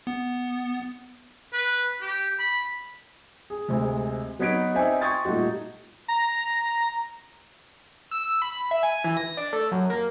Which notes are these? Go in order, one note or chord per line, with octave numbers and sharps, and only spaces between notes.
B3
B4
G4
B5
G#4
D2 C3 G#3
F#3 B3 D#4 G#6 B6 D7
C4 D#4 D5 E5 G5 G#5
G5 C6 C#6 D#6 G#6 A6
A#2 G3 A3 D#4 F#4
A#5
E6
B5
E5
G#5
E3
A#6
D4
A3
F#2
A#3